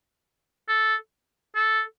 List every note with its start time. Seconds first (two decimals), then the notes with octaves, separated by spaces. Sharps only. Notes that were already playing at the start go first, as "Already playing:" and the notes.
0.69 A4
1.56 A4